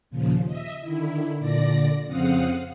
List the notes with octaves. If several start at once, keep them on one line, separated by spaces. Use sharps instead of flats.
D#2 A#2 C#3 F3
D#5 E5
D3 D#3 E4
A#2 D3 D5 A#6
F2 C#3 C4 F5 F#5 D#6